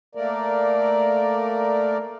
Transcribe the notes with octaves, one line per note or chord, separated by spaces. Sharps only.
A3 A#3 A#4 D5